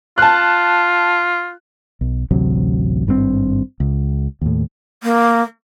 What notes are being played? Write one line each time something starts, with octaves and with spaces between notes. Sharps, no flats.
F4 A5 F#6
B1
A1 D2 C3 F#3
G#1 G2 C#3 C4
C#2
D#2 A2
A#3